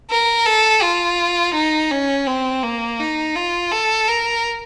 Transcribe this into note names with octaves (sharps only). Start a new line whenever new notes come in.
A#4
A4
F4
D#4
C#4
C4
A#3
D#4
F4
A4
A#4